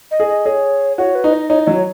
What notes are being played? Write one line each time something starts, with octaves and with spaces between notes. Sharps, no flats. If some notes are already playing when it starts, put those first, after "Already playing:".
D#5
G#4
D#5
G#4 C#5
F#4 C#5
B4
D#4
D#5
D#4 C#5
D#5
F#3 C#5